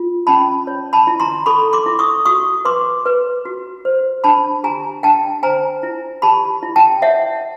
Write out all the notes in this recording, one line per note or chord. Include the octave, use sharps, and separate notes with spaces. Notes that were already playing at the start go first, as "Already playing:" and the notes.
Already playing: F4
C#4 A5 B5
C#5
A5 B5
E4
A#5 C6
A4 B5 C#6
C6 D6
E4
C#6 D#6
F#4 C#6 D#6
B4 C6 D6
B4
F#4
C5
D4 A5 B5
G4 G#5 A#5
D4 G5 A5
C5 G#5 A#5
E4
G4 A5 B5
E4
G5 A5
C#5 E5 F#5